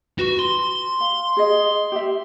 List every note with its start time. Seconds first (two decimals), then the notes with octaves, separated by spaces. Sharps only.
0.19 F#4 B4
0.39 C6
1.00 F5
1.37 G#4 D#5
1.92 G4 E5